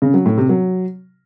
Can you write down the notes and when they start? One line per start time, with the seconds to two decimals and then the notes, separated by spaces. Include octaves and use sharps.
0.02 C#3
0.14 F#3
0.26 A2
0.37 C3
0.49 F#3